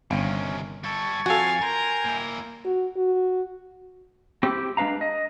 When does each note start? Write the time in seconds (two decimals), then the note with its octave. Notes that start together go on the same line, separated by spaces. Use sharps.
0.11 G1 C3 D#3 C#4
0.84 G3 A4 C#6 G#6 A6
1.26 F2 F#4 A4 F5 G#5
1.62 A#4 G5 G#5 A#5 C6
2.06 A#3 E4
2.65 F#4
2.97 F#4
4.43 C4 E4 G4
4.77 G#3 D4 B4 F5 A#5
5.01 D#5